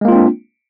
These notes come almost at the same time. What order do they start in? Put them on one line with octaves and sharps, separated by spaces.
G#3 A#3 F4 C4 D4